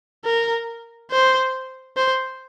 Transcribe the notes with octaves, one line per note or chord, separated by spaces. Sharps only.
A#4
C5
C5